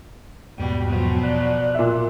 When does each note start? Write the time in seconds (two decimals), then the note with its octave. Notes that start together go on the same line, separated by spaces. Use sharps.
0.58 E2 G#2 B2 G3 G5
0.88 B2 F3 F#3
1.23 D5 F#6
1.74 A#2 E5